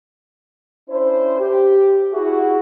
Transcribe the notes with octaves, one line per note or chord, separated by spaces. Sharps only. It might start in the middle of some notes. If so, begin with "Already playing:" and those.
C#4 D4 E4 C5
G4
E4 F#4 G#4